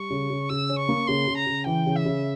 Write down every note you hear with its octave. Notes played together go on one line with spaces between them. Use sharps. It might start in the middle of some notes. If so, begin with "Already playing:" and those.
Already playing: G3 C#6
C#3
C#3
C#3 E6
C#4
C#6
A#3
C#3 C6
C#3
A#5
C#3
E3 G5
C#3
E5
C#3